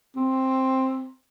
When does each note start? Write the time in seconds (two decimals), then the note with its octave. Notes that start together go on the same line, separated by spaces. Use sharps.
0.16 C4